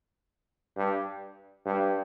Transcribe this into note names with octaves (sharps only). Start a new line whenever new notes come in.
G2
G2